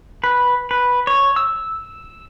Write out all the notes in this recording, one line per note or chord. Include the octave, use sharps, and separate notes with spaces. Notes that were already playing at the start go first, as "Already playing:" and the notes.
B4
B4
C#5
E6